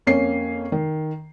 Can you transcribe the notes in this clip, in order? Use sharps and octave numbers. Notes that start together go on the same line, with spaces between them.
F2 A#3 C#4 C7
D#3